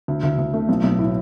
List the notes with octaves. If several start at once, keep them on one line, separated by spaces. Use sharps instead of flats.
D2
D2
D2
A3
B1
B1
A2